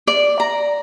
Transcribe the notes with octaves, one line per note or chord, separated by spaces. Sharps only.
D5
A#5